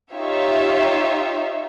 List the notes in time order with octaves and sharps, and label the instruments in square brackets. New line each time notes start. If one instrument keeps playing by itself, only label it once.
[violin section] D#4 F4 G4 C#5 E5 F5